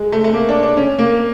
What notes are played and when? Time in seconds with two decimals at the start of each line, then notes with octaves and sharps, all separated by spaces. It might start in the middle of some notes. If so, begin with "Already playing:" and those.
Already playing: G#3
0.12 A3
0.24 A3
0.34 A#3
0.49 D4
0.63 D4
0.77 C#4
0.99 A#3